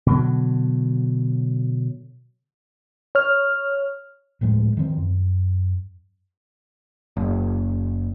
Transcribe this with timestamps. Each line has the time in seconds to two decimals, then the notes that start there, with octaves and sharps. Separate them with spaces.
0.06 B2 D3 F#3
3.15 C#5 F6
4.41 D1 A2 F3 G#3
4.77 D#3 F3 B3 C4
4.97 F#2
7.17 F#1